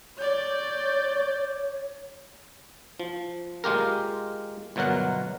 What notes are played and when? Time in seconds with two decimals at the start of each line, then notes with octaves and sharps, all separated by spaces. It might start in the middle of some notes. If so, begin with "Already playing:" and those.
0.18 C#5 D5 G6
3.00 F3
3.64 G#3 F4 G4 A#4
4.76 G1 B2 F#3 A#4 F#5